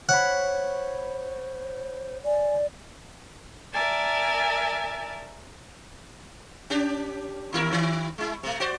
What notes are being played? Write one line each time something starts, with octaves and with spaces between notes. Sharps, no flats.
C5 C#5 F#5 B5
D5 G#5
A#4 D5 E5 G#5 A5
C#4 D4 G4
D#2 E4 A#4
D#3 E4
G#3 E4
C3 A3
F#4 C5 D5